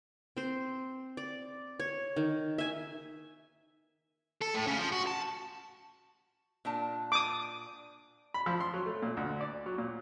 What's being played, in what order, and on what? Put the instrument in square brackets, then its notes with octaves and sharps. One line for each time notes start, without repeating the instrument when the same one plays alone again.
[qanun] C4 C5
D5
C#5
D#3
E5 G#5
[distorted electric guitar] A4
A2
C#3
F3
F#4
A5
[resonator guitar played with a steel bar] A#2 D4 A5
[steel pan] D6 D#6
[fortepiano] B5
F3
C6
F#3
A3
A#2
D2
D5
F#3
A#2